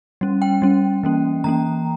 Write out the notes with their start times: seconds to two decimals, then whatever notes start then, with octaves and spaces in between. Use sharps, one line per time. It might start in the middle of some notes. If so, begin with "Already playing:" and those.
0.21 G3 C#4
0.42 G5
0.62 G3 C#4
1.03 E3 A#3 C#4
1.44 E3 A#3 C#4 A#5